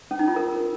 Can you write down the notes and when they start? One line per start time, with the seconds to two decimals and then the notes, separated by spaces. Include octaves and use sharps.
0.11 C#4
0.19 D#4
0.28 F4
0.36 A#4